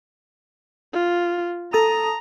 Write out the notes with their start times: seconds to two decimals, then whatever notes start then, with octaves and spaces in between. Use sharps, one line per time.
0.93 F4
1.73 A4 A5 A#5 D#6